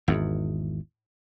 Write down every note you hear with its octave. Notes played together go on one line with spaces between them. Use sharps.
G#1 E2